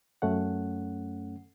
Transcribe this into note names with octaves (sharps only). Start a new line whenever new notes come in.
F#2 A3 C#4 F#5